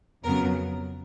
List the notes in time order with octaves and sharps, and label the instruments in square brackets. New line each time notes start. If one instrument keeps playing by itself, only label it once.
[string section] F2 C#3 F#3 B3 A#4